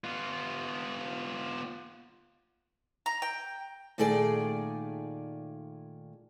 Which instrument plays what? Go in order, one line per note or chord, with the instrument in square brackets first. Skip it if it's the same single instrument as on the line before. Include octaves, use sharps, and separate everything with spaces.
[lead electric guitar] B3 F4
[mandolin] A#5
G5
[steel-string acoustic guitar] A#2 D#3 A3 G#4 A4 D5